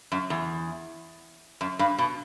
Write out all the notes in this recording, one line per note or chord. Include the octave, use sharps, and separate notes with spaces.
F#2
E2
F#2
G2
B2